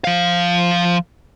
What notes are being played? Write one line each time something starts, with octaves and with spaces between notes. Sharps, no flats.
F3 F5